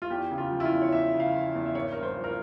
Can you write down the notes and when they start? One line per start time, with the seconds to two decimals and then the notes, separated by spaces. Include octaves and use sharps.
0.02 F4
0.10 E2 G4
0.31 C#3
0.38 F4
0.52 F3
0.60 E4
0.65 F4
0.72 E2
0.82 C#5
0.92 E2 E5
1.14 C#3
1.20 F5
1.34 F3
1.55 E2
1.66 E5
1.75 G#1 C#5
1.92 G2 A#4
2.03 C5
2.17 F3
2.24 A#4